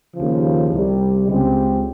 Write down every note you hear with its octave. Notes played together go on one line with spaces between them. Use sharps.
D#2 C#3 F3
C2 C3 G3
C#2 C#3 G#3 C4 G4